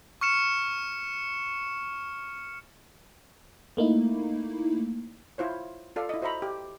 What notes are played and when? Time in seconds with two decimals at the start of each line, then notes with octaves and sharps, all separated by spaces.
0.21 C#6 F6 C#7 E7
3.77 A3 A#3 D#4 E4
5.38 E4 F4 C5 C#5
5.96 F4 A4 D5 F5
6.09 E4 D#5
6.22 F#4 C5 D#5 E5 A#5 B5
6.42 G4